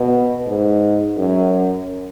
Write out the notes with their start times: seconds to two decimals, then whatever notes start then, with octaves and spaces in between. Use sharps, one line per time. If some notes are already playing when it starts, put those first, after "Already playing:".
Already playing: B2
0.47 G#2
1.17 F#2